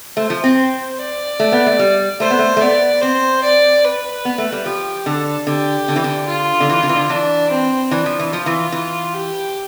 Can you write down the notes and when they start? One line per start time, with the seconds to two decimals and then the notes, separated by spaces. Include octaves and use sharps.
0.17 A3 C5
0.30 F3
0.44 C4
0.58 C5
0.99 D5
1.40 A3
1.52 B3
1.66 A3
1.79 G3
2.20 A3 C5
2.30 B3
2.39 A3
2.57 A3
2.61 B3 D5
3.02 C4 C5
3.43 D5
3.84 B4
4.25 B3
4.38 A3
4.52 G3
4.65 F3 G4
5.06 D3 A4
5.47 D3 G4
5.88 D3
5.96 E3
6.04 D3
6.28 F4
6.60 D3
6.69 E3
6.83 D3
6.89 E3
6.96 D3
7.09 E3 D4
7.50 C4
7.91 E3 D4
8.06 F3
8.19 E3
8.32 F3 F4
8.46 E3
8.72 E3
9.14 G4